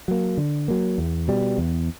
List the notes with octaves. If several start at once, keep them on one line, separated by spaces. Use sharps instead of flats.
F#3 A#3
D3
F#3 A#3
E2
B2 G3
E2